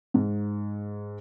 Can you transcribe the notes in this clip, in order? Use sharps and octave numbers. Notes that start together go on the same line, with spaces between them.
G#2